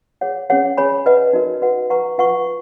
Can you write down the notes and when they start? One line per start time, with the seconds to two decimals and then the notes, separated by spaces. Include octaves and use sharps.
0.21 G#4 C#5 F#5
0.50 C#4 G#4 C#5 F#5
0.77 G#4 C#5 G#5 B5
1.06 B4 D#5 F#5
1.33 D#4 F#4 A#4 D#5
1.62 F#4 B4 D#5 F#5
1.90 B4 F#5 A#5 C#6
2.18 F4 B4 F#5 C#6